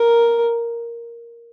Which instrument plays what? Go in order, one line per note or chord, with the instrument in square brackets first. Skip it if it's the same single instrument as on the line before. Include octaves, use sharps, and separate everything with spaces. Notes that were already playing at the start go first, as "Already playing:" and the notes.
Already playing: [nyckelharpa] A#4